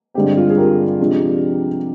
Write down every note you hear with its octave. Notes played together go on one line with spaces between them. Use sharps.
G2 D3 G#3 C4 G4
F4 G#4
G#4
G4 A#4
C3 F3 G#3 D4